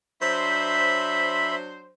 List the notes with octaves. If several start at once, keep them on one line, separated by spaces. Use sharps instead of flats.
F#3 D4 C5 E5 B5